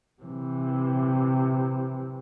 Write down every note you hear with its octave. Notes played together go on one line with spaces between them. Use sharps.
C3 E3